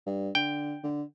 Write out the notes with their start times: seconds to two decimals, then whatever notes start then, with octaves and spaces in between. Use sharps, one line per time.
0.06 G2
0.35 D3 G5
0.83 D3